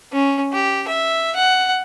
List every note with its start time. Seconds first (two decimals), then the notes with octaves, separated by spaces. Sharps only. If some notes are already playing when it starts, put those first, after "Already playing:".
0.13 C#4
0.53 G4
0.88 E5
1.35 F#5